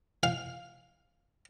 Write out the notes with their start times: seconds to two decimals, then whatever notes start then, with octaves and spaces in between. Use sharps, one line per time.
0.23 F5